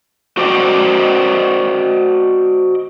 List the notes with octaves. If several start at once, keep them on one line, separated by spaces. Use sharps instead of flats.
F#4 C5 D5 D#5 G5